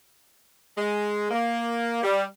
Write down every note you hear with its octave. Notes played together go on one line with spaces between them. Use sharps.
G#3
A#3
G3